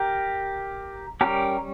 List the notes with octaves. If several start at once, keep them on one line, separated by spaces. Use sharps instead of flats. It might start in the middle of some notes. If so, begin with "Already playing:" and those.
Already playing: G4 A#4
G3 C#4 G4 A#4